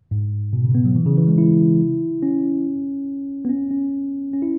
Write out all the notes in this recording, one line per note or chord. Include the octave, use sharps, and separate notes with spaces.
G#2
B2
C#3
B3
F#3
E3
C#3
E3
G#3
E4
C#4
B3
C#4
C#4
C#4
E4